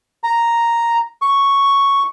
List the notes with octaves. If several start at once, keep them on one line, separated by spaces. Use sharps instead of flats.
A#5
C#6